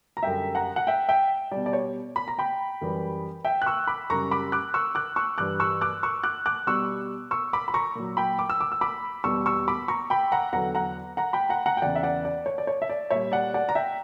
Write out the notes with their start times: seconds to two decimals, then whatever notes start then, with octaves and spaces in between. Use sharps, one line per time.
0.17 A#5
0.23 F#2 D3 G3 E5 G5
0.55 F#5 A#5
0.76 F#5
0.87 E5 G5
1.09 E5 G5
1.52 B2 G3 D5
1.66 D5
1.73 C#5
2.16 B5
2.28 A#5
2.39 G5 B5
2.81 F#2 E3 G3
3.45 E5 G5
3.62 F#6
3.66 C#6 E6
3.87 B5 D6
4.10 F#2 C#3 G3 A#5 C#6
4.31 B5 D6
4.52 D6 F#6
4.74 C#6 E6
4.95 D6 F#6
5.16 C#6 E6
5.38 G2 E3 G3 D6 F#6
5.60 C#6 E6
5.81 D6 F#6
6.03 C#6 E6
6.23 D6 F#6
6.46 D6 F#6
6.67 B2 G3 C#6 E6
7.31 C#6 E6
7.53 B5 D6
7.68 B5
7.74 A#5 C#6
7.95 A#2 F#3
8.17 G5 B5
8.39 D6
8.50 E6
8.61 D6
8.72 E6
8.81 B5 D6
9.24 E2 B2 G3 C#6 E6
9.46 C#6 E6
9.68 B5 D6
9.88 A#5 C#6
10.10 G5 B5
10.32 F#5 A#5
10.53 E2 D3 F#3 F#5 A#5
10.75 F#5 A#5
11.17 F#5 A#5
11.33 G5 B5
11.49 F#5 A#5
11.66 F#5 A#5
11.77 G5
11.82 E2 C#3 E3 D5 F#5
11.95 E5
12.03 D5 F#5
12.25 D5
12.46 C#5
12.58 D5
12.67 C#5
12.82 E5
12.90 D5
13.11 A#2 G3 C#5 E5
13.32 D5 F#5
13.54 D5 F#5
13.69 A#5
13.75 E5 G5